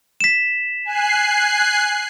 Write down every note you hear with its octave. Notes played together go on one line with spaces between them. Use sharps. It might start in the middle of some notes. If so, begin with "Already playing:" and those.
B6 E7
G#5 F#6 C7